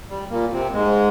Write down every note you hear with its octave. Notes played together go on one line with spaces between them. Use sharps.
G3
A#2 A#3
C3 C4
G#2 G#3